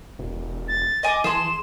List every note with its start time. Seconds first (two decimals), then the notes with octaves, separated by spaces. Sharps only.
0.19 E1
0.68 A6
1.03 D#5 G#5 D6
1.24 E3 G#4 A5 C6 E7